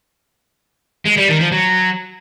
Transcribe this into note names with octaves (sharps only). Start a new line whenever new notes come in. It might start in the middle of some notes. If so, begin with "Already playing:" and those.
G#3
G3
D#3
F3
F#3